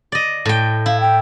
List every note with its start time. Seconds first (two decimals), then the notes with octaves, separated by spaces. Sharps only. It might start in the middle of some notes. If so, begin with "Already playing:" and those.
0.12 D5 D#5
0.45 A2 G5
0.86 E4 F5
1.00 G5